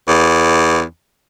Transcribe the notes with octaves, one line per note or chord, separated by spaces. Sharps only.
E2